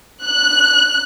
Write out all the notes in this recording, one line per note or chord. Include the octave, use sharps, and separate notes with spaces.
F#6